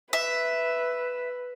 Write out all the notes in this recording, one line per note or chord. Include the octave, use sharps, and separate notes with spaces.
B4 E5